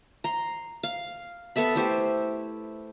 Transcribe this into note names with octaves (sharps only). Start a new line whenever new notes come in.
A#5 C6
F5
B3 A4 E5 B5
A3 E4 G4 C5